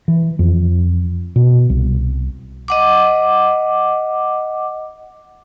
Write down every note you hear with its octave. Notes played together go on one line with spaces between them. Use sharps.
E3
F2
B2
C2
D#5 F#5 D6